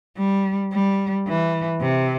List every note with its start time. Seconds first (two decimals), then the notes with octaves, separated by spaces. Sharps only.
0.17 G3
0.71 G3
1.27 E3
1.81 C3